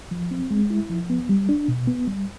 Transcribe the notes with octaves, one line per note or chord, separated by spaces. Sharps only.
F3
C4
G#3
E4
F3
B3
G3
D4
B2
B3
G3